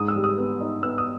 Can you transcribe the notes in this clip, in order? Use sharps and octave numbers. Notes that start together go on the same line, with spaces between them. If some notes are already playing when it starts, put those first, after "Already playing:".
Already playing: G#2 D#6
E6
G3
D#6
B3
D#4
B3 E6
D#6